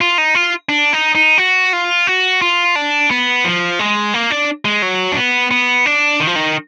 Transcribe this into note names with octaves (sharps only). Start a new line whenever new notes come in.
F4
D#4
F4
D4
D#4
D#4
F#4
F4
F#4
F4
D4
B3
F3
G#3
A#3
D4
G#3
F#3
D4
B3
B3
D4
D#3
F3
D#3